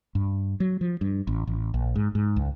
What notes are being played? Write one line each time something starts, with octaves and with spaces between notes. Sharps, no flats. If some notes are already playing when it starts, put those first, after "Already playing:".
G2
F#3
F3
G2
A1
A1
A#1
G#2
G#2
C#2